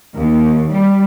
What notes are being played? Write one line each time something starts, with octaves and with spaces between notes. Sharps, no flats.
D#2
G3